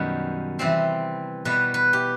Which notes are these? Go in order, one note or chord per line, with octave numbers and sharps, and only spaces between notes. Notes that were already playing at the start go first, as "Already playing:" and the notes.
Already playing: F#2 B2 D#3 G3 B3
C3 E3 G3 C4
B2 G3 B3 B4
B4
G4